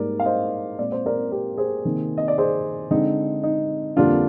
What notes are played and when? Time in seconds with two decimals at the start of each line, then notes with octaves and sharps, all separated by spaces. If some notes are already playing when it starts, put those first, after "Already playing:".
Already playing: G#2 G3 A#3 A#4 D5
0.20 F5
0.25 C5 D#5
0.78 A#2 G#3 C4 D5
0.92 C5
1.06 A#4 D5
1.32 G4 A#4
1.57 G#4 C5
1.85 C3 D#3 A#3
2.18 D#5
2.28 D5
2.38 G#4 C5
2.91 D3 G#3 C4 D#4
3.43 D#4
3.97 F2 D3 G3 A#3 D4 F4